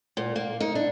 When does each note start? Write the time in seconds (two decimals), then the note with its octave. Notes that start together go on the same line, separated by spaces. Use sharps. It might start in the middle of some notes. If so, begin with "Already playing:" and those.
0.17 A#2
0.36 A#3
0.60 D#4
0.75 D4